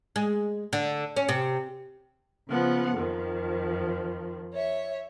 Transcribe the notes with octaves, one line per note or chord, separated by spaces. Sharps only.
G#3
D3
C#4
C3
C#3 F3 B3 F#5
F2 D#3 F3
C#5 E5